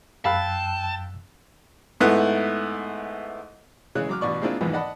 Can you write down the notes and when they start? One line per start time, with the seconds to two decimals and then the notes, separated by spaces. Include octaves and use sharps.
0.25 F#2 F5 G5 A5 B5 E6 F#6
2.00 G#2 A3 B3 E4 F#6
3.95 C#3 E3 G#3 C#5 F#6
4.09 F#3 D6 F6
4.21 A1 B2 D5 C#6
4.41 G#3 A#3 C4 D4 E4 F4
4.61 B1 E2 G#2 D#3 F3 B3
4.73 D5 D#5 F#5 A5 B5